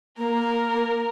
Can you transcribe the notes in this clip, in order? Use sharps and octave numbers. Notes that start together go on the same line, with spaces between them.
A#3 A#4